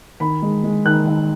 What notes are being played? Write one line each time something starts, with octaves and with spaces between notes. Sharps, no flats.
D#3 B5
G#3
G#3
D#3 F#6
D#3